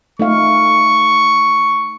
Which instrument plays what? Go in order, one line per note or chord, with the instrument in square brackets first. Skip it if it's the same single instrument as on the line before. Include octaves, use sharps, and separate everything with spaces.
[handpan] A3 D#4 F5 [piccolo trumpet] C#6